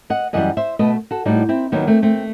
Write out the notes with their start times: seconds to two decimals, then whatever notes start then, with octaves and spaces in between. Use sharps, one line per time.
0.10 D#5 F#5
0.33 F#2 E3 G3 D#5 F#5
0.57 C5 E5
0.79 B2 A3 B4 D#5
1.11 F#4 A4
1.26 A2 G3 D#4 F#4
1.49 C4 E4
1.72 D#2 D#3 F#3 B3 D#4
1.87 A3 C4
2.02 A3 C4